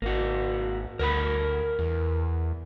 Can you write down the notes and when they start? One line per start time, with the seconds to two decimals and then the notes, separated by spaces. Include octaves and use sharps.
0.02 G#1 A#3 F#4
0.99 D2 A#4 F#5 B5
1.79 E2